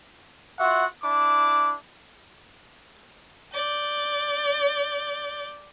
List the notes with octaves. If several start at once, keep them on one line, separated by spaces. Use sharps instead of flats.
F4 F#4 E5 F#5
D4 E4 D6
D5 G6